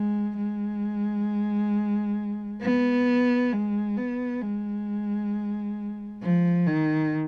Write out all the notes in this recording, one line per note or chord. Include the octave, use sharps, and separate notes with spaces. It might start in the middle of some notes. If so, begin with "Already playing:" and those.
Already playing: G#3
G#3
B3
G#3
B3
G#3
F3
D#3